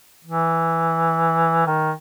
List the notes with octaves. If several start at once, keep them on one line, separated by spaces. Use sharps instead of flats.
E3
D#3